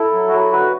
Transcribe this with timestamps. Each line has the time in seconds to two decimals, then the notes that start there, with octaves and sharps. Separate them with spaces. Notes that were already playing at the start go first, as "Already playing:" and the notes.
Already playing: E4 A4
0.13 F#3
0.28 F#4
0.33 F#3
0.39 A4
0.52 D3 F#4 B4